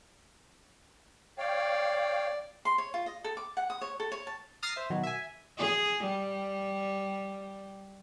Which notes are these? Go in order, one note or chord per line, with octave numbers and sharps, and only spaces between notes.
C#5 D5 F5 G5
C6
C#5
F4
D#5
A4
D6
F#5
D#6
C#5
A4
C#5
A5
A#5 D#6 F6 A6 C7
C5 E5
B2 D#3 F#3
E5 G#5
G#4
G3